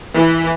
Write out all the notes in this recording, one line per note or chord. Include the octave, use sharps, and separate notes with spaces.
E3